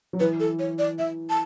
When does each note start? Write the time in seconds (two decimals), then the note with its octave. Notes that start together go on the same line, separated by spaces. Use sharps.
0.13 F#3
0.20 E3 B4
0.40 A4
0.59 C#5
0.79 D5
0.99 E3 E5
1.30 A5